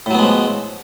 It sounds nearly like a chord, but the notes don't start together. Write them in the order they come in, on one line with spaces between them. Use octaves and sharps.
A2 F#3 B3 G#3 F3